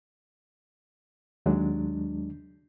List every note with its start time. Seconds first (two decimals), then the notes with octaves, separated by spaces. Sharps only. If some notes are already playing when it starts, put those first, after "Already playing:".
1.46 D#2 F#3 G#3 D4